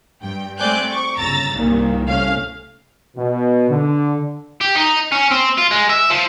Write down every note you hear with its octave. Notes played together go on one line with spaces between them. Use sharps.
G2 G5
A3 C4 D5 G#5 F#6 G6
C#6 D6
G1 C#3 A#5 E6 A6
C2 G2 A#2 D#3 A#3
C2 A3 C#4 F5 F6
B2
D3
G4
D#4
C#4
C4
F4
G#3
E5
F3